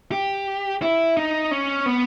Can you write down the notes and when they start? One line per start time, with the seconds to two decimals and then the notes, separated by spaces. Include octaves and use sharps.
0.12 G4
0.82 E4
1.17 D#4
1.51 C#4
1.86 B3